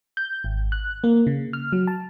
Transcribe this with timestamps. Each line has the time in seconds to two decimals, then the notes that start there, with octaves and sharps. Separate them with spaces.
0.17 G6
0.44 G#1
0.72 F#6
1.04 A#3
1.27 C#3
1.53 F6
1.72 F#3
1.87 A5